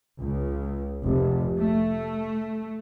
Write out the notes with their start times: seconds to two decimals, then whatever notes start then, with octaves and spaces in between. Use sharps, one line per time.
0.20 C#2
1.02 F1
1.58 A3